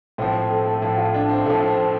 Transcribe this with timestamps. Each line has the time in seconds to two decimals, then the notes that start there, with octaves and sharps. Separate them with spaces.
0.18 A2 F3 C4
0.35 C4
0.50 A3
0.66 A3
0.82 A2 F3
0.98 F4
1.14 D4
1.29 C4
1.46 A2 F3 A3
1.67 C4